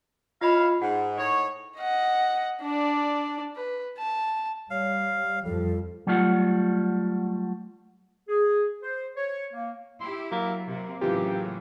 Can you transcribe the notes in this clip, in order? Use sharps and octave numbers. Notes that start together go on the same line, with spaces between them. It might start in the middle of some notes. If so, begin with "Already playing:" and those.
E4 F4 C#5 D#5 F5 B5
G#2 F#5
A2 D#4 C#5
D#5 F#5
D4 D5
B4
A5
G3 C#5 F5
F2 F3 G3 A4
F#3 G3 A3 F4 F#5
G#4
C5
C#5
A#3
E4 G4 C6
F#3 A#3 B6
C3 A#3
A2 C#3 E3 F#3 F4 G4